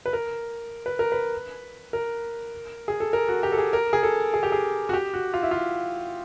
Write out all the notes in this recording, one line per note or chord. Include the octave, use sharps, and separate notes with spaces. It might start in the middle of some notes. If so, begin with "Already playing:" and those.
B4
A#4
B4
A#4
B4
A#4
G#4
A4
A#4
F#4
G4
A4
G#4
A#4
G#4
A4
G#4
G4
G#4
F#4
G4
F#4
F4
E4
F4